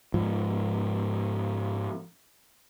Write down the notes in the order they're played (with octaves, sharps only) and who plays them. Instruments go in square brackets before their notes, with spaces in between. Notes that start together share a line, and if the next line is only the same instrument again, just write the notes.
[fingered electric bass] G#2 F3